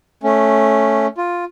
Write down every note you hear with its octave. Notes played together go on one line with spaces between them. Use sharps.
A3 C#4
F4